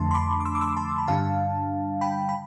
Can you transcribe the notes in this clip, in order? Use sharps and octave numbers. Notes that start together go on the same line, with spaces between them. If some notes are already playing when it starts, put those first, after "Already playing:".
Already playing: F2 D3 F3 A3 D4 A5 C6
C6
B5 D6
D6
C6 E6
D6
C6 E6
A5 C6
B5
G2 D3 G3 D4 F5 A5
G5 B5
B5